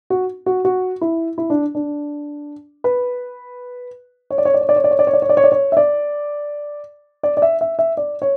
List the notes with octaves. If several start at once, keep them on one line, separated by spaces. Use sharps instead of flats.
F#4
F#4
F#4
E4
E4
D4
D4
B4
C#5
D5
C#5
D5
C#5
D5
C#5
D5
C#5
D5
C#5
D5
C#5
D5
C#5
D5
C#5
E5
D5
D5
D5
E5
E5
E5
D5
C#5